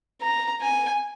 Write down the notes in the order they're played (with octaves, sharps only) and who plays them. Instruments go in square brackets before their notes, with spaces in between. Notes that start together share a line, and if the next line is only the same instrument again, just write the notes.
[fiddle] A#5
G#5